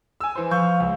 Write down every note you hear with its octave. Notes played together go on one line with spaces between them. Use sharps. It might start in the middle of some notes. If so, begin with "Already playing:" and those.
G#5 E6
E3 C5
F3 B4 F5 C#6 G6
C#2